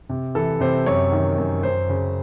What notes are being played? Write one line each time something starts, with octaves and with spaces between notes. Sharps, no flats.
C3
E3 A4
C3 C5
F#2 C#5
D#3
F#2
F#2 C5
C#3